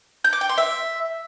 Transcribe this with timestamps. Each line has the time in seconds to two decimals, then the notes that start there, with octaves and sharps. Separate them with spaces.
0.24 G6
0.33 D6
0.41 G5
0.49 C6
0.58 E5